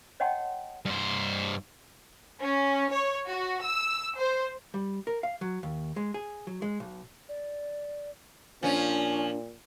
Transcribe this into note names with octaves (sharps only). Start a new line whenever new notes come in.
C#5 D#5 F#5 G5 A5 C6
G2 C5
C#4
C#5
F#4
E6
C5
G3
A#4
F5
F#3
D#2
G#3
G#4
F#3
G#3
B1
D5
A#2 F3 C#4 D4 G#5